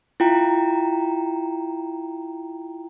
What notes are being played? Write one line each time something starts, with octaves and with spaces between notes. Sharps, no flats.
E4 F4 G5 A#5